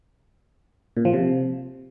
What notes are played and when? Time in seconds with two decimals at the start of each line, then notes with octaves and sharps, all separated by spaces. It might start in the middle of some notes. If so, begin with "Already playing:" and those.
0.97 A#2
1.05 F3
1.14 C3